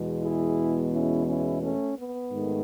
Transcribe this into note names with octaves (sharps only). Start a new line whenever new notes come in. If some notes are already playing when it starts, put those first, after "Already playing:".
Already playing: E2 B2 G#3
E4 G#4
C#4 E4
C#4 E4
A3 C#4
B3
G#2 D#3 A3